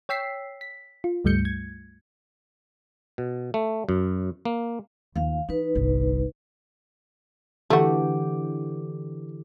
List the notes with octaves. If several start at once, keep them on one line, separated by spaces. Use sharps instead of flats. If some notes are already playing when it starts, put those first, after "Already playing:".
C#5 G5 E6 B6 C7
B6
F4
C#2 G2 G3 A3 G6 C#7
G#6
B2
A3
F#2
A#3
D#2 F3 F5
E3 D#4 B4
G1 C2
D3 E3 A3 F#4 G4